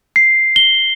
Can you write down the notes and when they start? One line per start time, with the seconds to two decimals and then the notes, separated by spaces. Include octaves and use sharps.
0.16 C7
0.56 G7